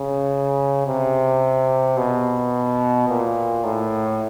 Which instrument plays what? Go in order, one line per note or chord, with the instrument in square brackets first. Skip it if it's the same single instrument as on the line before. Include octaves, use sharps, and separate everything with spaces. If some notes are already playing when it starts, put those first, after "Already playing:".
Already playing: [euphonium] C#3
C3
B2
A#2
A2